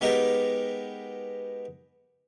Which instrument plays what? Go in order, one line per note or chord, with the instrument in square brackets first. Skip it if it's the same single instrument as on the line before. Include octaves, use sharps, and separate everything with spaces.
[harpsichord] G#3 B3 D#4 G4 A#4